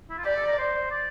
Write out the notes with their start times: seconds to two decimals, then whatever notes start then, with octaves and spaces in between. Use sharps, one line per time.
0.10 E4
0.18 F4
0.25 G4 D5
0.36 A4
0.47 A#4
0.58 C5
0.91 D5